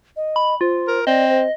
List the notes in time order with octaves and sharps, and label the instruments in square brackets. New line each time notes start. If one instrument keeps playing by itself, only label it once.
[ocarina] D#5
[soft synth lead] B5
[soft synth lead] F4 [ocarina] C5
[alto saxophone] A#4
[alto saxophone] C4 [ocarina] D5 [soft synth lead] D#5
[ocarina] C5